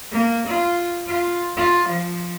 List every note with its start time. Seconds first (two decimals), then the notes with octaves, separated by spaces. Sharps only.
0.12 A#3
0.46 F4
1.07 F4
1.56 F4
1.88 F3